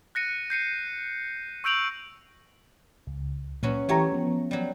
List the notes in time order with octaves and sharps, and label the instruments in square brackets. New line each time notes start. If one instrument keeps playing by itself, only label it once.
[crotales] F#6 A#6 C#7 D#7
G6 C7 C#7 D#7
C#6 E6 G6 D7 F7 F#7
[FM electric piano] C#2
[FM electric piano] A#2 [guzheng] F#3 C#4 B4
[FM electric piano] E3 G4 A#5 [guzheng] A3 C#5
[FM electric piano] F3 B3
[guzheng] F#3 G3